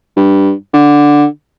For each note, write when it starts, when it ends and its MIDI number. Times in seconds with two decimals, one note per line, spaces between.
0.16 0.52 43
0.74 1.26 50